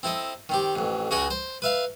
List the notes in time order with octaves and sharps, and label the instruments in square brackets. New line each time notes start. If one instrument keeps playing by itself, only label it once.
[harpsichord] C4 E4 A4 D#5
D#3 C4 G4
A1 F2
C#2 C#3 F#4 G#4 D#5 B5
C5
B4 E5 F5